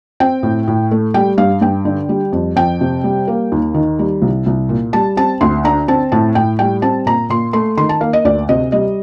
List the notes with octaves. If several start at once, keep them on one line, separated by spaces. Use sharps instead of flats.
C4 G5
A2
A2
A3
G3 G5
G2 F5
G2 G5
D3
G3
F2
F2 G5
C3
G3
A#3
D#2
D#3
G3
C2
C2
A#2
G3 A5
C4 A5
D2 C6
D3 A#5
C4 A5
A2 A5
A2 G5
G3 G5
C4 A5
A#2 A#5
A#2 C6
A3 C6
D#3 C6
A5
A#3 F5
D#5
D2 D5
C3 D#5
G3 D#5